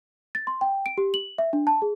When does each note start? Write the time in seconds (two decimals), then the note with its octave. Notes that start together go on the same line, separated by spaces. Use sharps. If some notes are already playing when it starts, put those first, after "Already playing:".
0.35 A6
0.47 C6
0.61 G5
0.86 D7
0.98 G4
1.14 F#7
1.38 E5
1.53 D4
1.67 A5
1.82 G#4